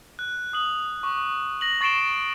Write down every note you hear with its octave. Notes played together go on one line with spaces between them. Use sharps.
F#6
D#6 F#7
C#6 D6
A#6 F#7
C#6 A6 C7 D7 E7 G7